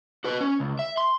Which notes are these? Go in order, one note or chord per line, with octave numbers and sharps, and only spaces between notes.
F#4 B4
C#4
C#2
E5
C6